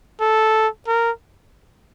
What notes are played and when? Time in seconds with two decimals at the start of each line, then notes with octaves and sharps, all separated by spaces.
0.21 A4
0.88 A#4